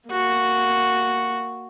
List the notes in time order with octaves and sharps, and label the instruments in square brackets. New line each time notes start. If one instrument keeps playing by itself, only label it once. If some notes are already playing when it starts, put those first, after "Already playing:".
[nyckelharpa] A#3 F#4